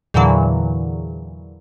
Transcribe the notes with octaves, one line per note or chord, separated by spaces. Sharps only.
E2 A#2 D3 E3 F#3